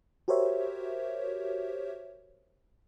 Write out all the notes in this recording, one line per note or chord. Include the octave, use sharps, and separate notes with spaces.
F#4 G4 A#4 C5 C#5 E5